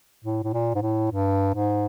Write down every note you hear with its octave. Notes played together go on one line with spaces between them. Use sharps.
A2
A2
A#2
G#2
A2
G2
G#2